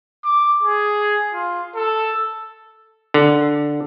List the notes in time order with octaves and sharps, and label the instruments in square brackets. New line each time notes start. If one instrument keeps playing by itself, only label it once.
[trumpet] D6
G#4
F4
A4
[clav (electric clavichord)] D3